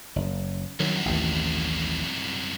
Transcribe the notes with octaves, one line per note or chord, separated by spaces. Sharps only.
F#1
C2 F#2 D#3 F#3
A1 D#2